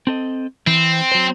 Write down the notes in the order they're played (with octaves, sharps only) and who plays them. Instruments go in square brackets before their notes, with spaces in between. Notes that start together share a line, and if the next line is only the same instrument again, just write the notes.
[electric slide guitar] C4 A4 D#5
[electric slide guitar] E3 [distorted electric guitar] C4
[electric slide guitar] F#3 C5